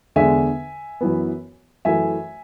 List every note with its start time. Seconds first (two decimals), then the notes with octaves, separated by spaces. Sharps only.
0.16 E2 D3 G#3 E5 G#5
1.01 F#2 E3 B3
1.85 F#2 E3 A3 E5 G#5